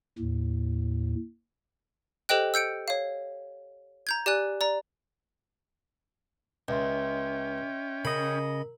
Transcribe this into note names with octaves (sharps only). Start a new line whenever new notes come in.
D#2 A2
G4 A4 C5 D#5 G5 F#6
E6 G6 C#7 D7
C#5 F5
A#5 G6 G#6
G4 D5 G#5 F#6
D5 A#5
C#2 C#4 D#5 E5 G5 C6
C#3 A#4 D#5 B5